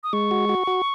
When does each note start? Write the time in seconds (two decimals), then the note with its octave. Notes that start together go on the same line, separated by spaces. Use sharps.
0.04 D#6
0.13 G#3 C#6
0.31 F#4
0.49 F#4
0.67 F#4